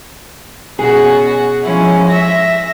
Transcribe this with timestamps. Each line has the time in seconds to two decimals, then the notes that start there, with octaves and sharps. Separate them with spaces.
0.79 B2 C#4 F#4 G#4
1.63 F3 G#3 C#4 E4
2.10 E5 A#6